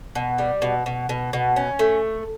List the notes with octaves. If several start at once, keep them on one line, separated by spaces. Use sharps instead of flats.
B2
G3
B2
B2
B2
B2
C#4
A3